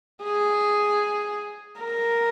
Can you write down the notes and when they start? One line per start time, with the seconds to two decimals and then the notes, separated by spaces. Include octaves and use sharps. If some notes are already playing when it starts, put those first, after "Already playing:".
0.23 G#4
1.80 A#4